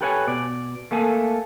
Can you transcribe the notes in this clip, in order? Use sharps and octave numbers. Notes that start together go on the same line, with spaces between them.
G4 A4 B4 C#5 F#5 G#5
B2 D5
A3 A#3 A4 G#5